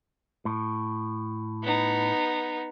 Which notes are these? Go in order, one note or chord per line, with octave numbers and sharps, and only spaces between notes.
A2
B3 D#4